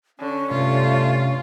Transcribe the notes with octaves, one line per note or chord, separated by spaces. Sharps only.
D3 C#4
G2 C3 A3 F4